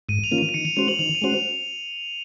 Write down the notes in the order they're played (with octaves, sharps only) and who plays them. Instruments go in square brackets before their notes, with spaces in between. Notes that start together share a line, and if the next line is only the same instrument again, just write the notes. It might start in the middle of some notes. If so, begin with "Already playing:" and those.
[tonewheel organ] G#2 [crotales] D#7
[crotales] F7
[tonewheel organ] D#3 A#3 C#4 F4
[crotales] D#7
D#7
[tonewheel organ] D#3 [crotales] C#7
[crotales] F7
[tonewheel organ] G#3 C#4 F#4 C5 [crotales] F7
[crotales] F#7
[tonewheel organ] D#3 [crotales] F7
[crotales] D#7
[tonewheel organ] G#3 C#4 F#4 C5
[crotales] F7